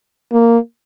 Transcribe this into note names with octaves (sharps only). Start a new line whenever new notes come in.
A#3